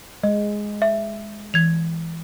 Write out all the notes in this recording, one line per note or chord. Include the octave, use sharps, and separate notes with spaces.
G#3 D#5
E5
E3 G#6 F7